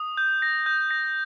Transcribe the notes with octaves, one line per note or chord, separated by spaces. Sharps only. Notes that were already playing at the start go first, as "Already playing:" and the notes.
Already playing: D#6
G6
A#6
G6
A#6